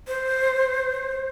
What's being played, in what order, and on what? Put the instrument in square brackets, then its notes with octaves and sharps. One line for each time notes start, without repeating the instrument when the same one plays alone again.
[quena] C5